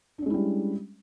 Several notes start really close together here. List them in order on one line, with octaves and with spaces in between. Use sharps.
D4 C#4 G#3 E4 G3